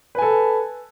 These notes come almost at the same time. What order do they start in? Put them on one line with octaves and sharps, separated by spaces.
B4 G#5 A4